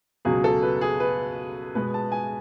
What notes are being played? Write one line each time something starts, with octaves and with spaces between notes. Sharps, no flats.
C#2 B2 F#3 G#4
A4
B4
G#4
B4
B2 G#3 B3 B4
A5
G#5